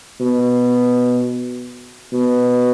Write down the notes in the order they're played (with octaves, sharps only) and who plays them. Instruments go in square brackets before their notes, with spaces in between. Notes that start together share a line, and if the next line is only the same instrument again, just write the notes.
[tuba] B2
B2